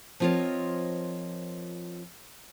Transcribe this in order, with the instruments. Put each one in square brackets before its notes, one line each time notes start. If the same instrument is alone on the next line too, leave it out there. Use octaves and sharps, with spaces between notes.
[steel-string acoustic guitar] F3 C4 F4 A#4 C#5 D#5